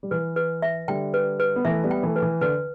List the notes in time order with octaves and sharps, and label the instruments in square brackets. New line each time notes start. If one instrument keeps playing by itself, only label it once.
[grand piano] G3
[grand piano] E3 [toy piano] B4
[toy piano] B4
E5
[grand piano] D3 G3 [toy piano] G5
[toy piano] B4
B4
[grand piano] B3
[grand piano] E3 A3 [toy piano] E5
[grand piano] G3 B3
[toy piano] G5
[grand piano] E3 A3
[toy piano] B4
[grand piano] E3
[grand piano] D3 [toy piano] B4